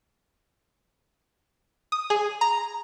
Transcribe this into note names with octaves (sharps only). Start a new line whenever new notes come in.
D#6
G#4
A#5